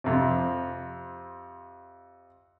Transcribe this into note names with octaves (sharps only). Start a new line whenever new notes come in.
F2 C3